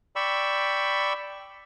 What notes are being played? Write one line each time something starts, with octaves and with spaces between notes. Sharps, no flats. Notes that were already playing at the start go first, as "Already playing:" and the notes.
D5 G5 B5 C#6 E6